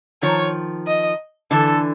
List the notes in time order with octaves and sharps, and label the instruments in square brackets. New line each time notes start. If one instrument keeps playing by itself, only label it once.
[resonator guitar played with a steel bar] D#3 F3 [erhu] C#5
[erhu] D#5
[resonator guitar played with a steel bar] D3 E3 [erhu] A4